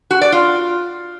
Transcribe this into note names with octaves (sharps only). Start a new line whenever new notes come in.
F#4
D5
F4